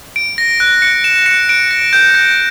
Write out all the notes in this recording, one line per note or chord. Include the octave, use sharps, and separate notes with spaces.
D7
A#6
F#6
C#7
E7
C#7
D7
A#6
G6
A#6